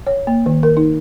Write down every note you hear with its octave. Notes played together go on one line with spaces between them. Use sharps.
C#5
A#3
D#3
A#4
D#4